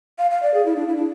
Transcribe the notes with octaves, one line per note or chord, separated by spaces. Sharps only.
F5
F5
D5
G#4
E4
D4
E4
D4